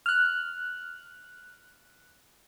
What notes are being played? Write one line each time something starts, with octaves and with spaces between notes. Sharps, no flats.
F6 F#6